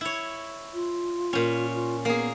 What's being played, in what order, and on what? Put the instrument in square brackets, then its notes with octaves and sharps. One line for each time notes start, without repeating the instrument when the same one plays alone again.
[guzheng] E4 C#5
[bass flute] F4
[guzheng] A#2 C#4
[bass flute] F4
[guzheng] A#3 G#4 [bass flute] B3